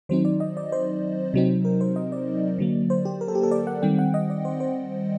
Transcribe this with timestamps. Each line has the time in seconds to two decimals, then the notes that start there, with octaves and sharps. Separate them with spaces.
0.09 D#3 F#3 C4 D#4 C5
0.25 D5
0.40 D#5
0.57 D5
0.72 C5
1.34 C3 F#3 C4 D#4
1.65 A#4
1.81 C5
1.96 D#5
2.12 D5
2.58 D3 F#3 A#3
2.90 C5
3.05 G4
3.21 A#4
3.28 A4
3.35 G4
3.43 A4
3.51 D5
3.67 F#5
3.82 D#3 G3 C4 G5
3.99 F#5
4.14 D#5
4.30 D5
4.45 C5
4.60 C5